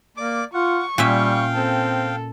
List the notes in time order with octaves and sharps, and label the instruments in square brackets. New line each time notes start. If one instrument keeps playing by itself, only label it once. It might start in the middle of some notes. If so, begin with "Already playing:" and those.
[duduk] A#3 [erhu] D5 [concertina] D6
[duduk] F4 [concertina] F#5 [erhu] C#6
[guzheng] A#2 C#4 E5 [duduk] G3 [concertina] F5 G5
[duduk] C4 [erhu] A4